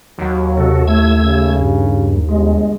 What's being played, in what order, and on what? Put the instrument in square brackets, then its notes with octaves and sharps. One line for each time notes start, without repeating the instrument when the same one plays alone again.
[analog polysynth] D#2 [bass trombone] F#3
[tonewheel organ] C3 F#4 A4
[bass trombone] A2 [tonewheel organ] A3 E6 G#6
[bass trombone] C#3
[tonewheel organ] G2
[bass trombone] G1 [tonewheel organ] G#3